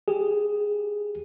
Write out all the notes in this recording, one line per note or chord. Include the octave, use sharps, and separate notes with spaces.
G4 G#4